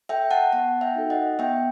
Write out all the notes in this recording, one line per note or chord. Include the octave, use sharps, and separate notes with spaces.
A4 E5 G5
F#5 A5
B3 F#5 A5
E5 G5
D#4 F#4 A4
D#5 F#5
B3 E5 G5